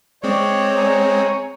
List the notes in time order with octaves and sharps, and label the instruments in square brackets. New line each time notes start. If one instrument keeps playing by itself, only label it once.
[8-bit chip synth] G#3 C4 [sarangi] C#5 [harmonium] D5
[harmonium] G#5 A#5